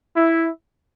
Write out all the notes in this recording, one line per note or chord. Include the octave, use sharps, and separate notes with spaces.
E4